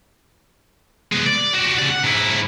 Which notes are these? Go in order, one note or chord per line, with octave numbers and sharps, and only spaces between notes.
G#3 B3
D5
F#4 G4
C#3 D5
F#5
G#2 E4